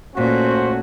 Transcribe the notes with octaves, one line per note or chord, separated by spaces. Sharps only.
A#2 A3 C#4 F#4 C5